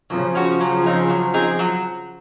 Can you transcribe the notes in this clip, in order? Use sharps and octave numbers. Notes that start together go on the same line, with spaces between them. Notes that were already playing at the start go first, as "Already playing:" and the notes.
C#3 F3 F#3
C#4 F#4
F#3
C4 D#4 G#4
F#3
C4 D#4 G#4
F#3